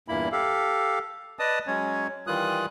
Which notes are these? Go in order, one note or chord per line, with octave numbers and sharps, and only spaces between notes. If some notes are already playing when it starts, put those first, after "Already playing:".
E2 G2 A#2 A#3 E4 B5
G4 A4 F5
B4 D5 D#5 A5 D#6
F#3 G#3 C#4 C#5
D#3 E3 G3 F4 D#6 F#6